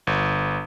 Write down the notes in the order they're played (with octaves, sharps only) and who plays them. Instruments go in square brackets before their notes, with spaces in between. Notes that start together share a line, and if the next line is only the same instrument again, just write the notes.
[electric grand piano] G1